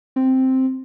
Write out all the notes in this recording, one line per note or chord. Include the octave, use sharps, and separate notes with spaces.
C4